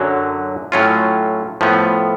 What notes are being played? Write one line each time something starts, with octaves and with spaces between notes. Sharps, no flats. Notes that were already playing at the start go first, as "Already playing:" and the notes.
Already playing: F#2 D3 F#3
A2 F#3 C#4 F4
A2 F3 B3